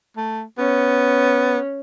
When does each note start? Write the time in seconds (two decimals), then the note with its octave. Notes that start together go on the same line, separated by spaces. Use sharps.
0.17 A3
0.58 B3 C#4